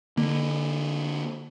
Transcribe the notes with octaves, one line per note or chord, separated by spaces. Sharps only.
D3 A#3